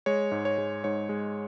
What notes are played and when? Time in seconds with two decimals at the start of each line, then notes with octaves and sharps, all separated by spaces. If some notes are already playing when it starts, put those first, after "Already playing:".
0.06 G#3 C#5
0.31 G#2
0.45 C#5
0.58 G#3
0.84 G#2 C#5
1.09 G#3